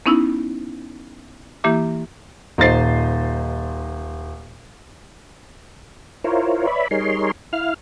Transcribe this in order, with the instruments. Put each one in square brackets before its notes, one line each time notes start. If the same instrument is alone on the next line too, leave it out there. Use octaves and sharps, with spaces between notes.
[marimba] B3 C#4 D#4 E4 E6
E3 A#3 E4 G4 E5 D6
[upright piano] D#1 D#4 C5 D#5 A6 C7
[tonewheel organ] E4 F4 A#4 C5 C#5
B4 C#5 D5 E5 B5
G3 D#4 G#4 A#4 C#5 C6
E4 F5 F6